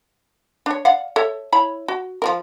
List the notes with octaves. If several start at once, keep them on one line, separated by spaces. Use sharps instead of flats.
D4 C#5
D5 F5 F#5
A4 C#5 E5
E4 C#5 B5
F#4
F3 F4 A#4